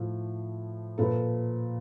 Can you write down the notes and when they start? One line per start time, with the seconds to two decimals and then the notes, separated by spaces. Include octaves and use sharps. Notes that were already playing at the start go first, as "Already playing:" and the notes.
Already playing: A2 F3
0.98 A#2 F3 A4 B4